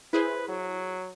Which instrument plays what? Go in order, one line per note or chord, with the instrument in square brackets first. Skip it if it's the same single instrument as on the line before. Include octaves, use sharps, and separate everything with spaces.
[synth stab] E4 G#4 C5 [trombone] B4
[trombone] F#3